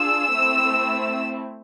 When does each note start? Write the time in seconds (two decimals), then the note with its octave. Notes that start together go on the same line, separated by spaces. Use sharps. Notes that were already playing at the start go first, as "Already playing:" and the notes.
Already playing: D4 F4 G#4 E6
0.34 A3 C4 E4